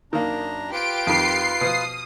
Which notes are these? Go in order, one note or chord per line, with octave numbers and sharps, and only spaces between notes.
F#2 D#3 A#3 D4 A#5
F4 G4 B4 C6 D7
F2 D#3 C7
B2 F3 D#6